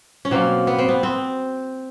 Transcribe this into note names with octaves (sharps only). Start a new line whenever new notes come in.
C#4
B2 F#3 A#3 C4
B3
C4
B3
C4